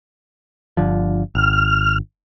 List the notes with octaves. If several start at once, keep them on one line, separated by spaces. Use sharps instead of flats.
G1 D3 F3
G#1 F6